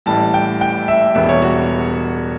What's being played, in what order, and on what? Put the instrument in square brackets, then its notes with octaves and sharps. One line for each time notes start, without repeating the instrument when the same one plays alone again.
[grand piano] A1 A2 E3 G3 A5
G5
G5
E5
E1 E2 B2 G3 E5
C#5
F#4